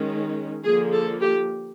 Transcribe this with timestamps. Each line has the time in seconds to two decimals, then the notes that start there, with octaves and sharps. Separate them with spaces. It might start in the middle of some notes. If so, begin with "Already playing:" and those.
Already playing: D#3 G#3 C#4
0.63 D3 F3 A#3 G#4
0.92 A4
1.21 G4